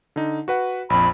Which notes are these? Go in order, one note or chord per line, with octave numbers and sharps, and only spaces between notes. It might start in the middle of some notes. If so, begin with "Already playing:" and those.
D3 D#4
F#4 B4 F#5
A#1 F2 B5